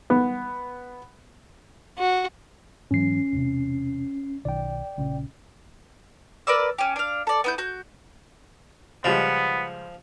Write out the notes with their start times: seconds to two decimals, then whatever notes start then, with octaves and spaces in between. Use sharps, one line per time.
0.10 B3
1.98 F#4
2.91 G#2 E3 F#3 C#4 C7
3.33 E1 C3
4.45 B1 D#3 D5 G5
4.98 A#1 C#3
6.47 A#4 B4 D5 E6
6.78 C#4 G4
6.96 D4 F5
7.27 A4 D5
7.44 B3 E4 G6
7.58 F#4 G6
9.04 C#2 F3 G3 G#3 B3